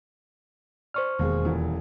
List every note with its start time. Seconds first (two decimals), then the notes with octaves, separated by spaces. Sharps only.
0.94 C5 D5 C#6 F6
1.19 E1 D#2 B2 G#3
1.45 D#1 A#2 E3